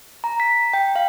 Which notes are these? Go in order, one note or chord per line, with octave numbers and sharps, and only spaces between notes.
A#5
B6
G5
F5